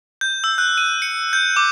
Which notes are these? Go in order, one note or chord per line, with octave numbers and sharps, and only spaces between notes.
G6
E6
F#6
D#7
C#7
G6
D6